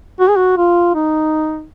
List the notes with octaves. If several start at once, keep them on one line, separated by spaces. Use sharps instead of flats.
F#4
G#4
F#4
F4
D#4